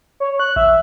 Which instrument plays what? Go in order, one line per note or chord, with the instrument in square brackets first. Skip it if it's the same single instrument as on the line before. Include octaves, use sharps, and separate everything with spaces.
[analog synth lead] C#5
F#6
[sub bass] A1 [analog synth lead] E5